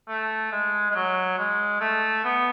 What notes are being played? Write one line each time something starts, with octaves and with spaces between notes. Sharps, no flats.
A3
G#3
G#3
F#3
G#3
A3
B3